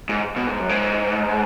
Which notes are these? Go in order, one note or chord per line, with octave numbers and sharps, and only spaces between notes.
G#2
B2
G#2
F#2
G#2